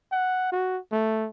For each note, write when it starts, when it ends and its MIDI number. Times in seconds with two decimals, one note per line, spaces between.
0.12 0.51 78
0.52 0.79 66
0.92 1.29 57